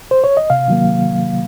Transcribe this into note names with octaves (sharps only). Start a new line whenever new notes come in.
C5
C#5
D#5
C3 F5
D#3 F#3 A#3